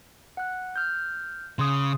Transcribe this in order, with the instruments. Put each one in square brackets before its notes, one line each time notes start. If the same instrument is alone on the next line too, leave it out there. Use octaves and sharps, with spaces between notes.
[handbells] F#5 F#6
F6 G6
[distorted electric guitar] C#3 [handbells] C6 D#6